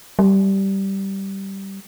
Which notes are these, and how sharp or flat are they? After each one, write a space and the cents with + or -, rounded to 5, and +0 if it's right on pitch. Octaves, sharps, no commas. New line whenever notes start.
G3 -10